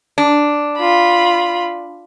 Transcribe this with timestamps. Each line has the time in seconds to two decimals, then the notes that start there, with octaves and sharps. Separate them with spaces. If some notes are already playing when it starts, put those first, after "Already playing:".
0.18 D4
0.78 F4 B5